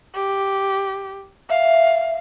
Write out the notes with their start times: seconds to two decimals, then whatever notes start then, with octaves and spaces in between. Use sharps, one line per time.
0.15 G4
1.50 E5 F5